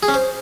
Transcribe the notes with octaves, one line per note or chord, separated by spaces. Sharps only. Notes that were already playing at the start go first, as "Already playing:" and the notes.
G#4
C#4
C5